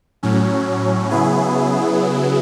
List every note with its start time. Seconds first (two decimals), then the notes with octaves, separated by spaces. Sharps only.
0.23 A2 F#3 C#4
1.10 C#3 F#3 B3 E4 G#4